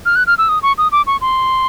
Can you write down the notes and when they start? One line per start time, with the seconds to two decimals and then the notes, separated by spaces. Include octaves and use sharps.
0.06 F6
0.16 F#6
0.27 F6
0.38 E6
0.49 D#6
0.63 C#6
0.78 D#6
0.92 D6
1.07 C#6
1.21 C6